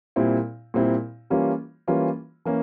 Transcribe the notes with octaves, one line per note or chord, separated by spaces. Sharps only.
A#2 G3 C4 E4
A#2 G3 C4 E4
E3 G3 A#3 C#4 F4
E3 G3 A#3 C#4 F4
E3 A#3 C#4